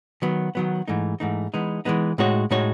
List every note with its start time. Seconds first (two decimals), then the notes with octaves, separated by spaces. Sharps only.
0.22 D#3 F#3 B3
0.55 D#3 F#3 B3
0.88 G#2 E3 A3 D#4
1.20 G#2 E3 A3 D#4
1.54 E3 G#3 B3 D#4
1.85 E3 G#3 B3 D#4
2.18 A2 G#3 D#4 F#4 C#5
2.51 A2 G#3 D#4 F#4 C#5